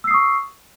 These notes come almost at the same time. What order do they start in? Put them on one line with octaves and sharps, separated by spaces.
E6 C7 D#6 C#6